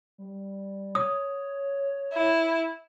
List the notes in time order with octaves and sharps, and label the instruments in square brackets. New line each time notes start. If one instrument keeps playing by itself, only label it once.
[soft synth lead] G3
[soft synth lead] C#5 [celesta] D#6
[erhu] E4